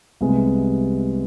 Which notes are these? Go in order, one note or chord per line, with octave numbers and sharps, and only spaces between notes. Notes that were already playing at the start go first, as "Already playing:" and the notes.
C2 C3 G#3 B3